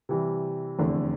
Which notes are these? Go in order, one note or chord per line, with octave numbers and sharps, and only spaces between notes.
C3 E3 G3
F1 E2 D3 A3 C4